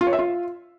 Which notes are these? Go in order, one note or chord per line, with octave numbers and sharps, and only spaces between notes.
F4
C#5
E5
F4